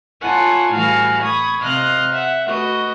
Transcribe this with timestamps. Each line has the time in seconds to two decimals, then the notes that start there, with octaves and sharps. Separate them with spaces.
0.21 E4 F4 A4 C#5 F#5 G#5
0.73 A2 E3 G3 F#4 F5 G#5
1.22 B5 C#6 D#6 G#6
1.62 C3 C5 D#5 F5 F6 F#6
2.12 E5 F#5
2.47 A3 F#4 B4 D#5